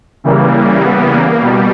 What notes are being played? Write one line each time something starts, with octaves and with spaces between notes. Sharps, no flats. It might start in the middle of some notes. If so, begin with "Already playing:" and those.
C#3 E3 G3 A#3
B3
A#3
B2 G3